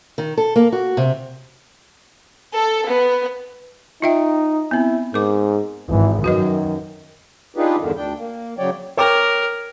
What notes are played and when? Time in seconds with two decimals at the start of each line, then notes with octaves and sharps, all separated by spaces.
0.18 D#3
0.37 A4
0.56 A#3
0.72 F#4
0.97 C3
2.55 A4
2.89 B3
4.02 D#4 F4 E5 G5
4.71 B3 C4 E4
5.14 G#2 A#4 D6
5.89 G#1 E3
6.24 F#2 D#3 F#4 B4 D#5
7.57 D4 D#4 F4 G4 G#4 B4
7.79 E2 G2 D3 D#3
7.96 D2 D4 G5
8.17 A#3
8.59 C#3 F#3 C#5 D5 G5
8.97 A#4 C#5 G5 D6